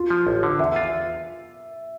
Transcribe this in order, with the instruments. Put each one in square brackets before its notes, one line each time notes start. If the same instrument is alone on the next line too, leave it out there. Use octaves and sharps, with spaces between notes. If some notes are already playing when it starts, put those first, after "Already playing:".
Already playing: [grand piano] F4
[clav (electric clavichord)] F3
A1
D3
[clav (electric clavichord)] E2 [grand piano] E5
[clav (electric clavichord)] F4